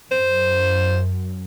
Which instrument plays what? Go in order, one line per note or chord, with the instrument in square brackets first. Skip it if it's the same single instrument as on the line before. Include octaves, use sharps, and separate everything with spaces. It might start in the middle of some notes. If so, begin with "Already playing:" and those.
[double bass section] F#2 [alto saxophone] C5